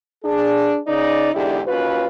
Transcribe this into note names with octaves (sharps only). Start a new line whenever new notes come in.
D4 G#4
C#3 D#4 D5
E2 G#2 D3 D4 E4 G4
D#2 C#4 F4 F#4 B4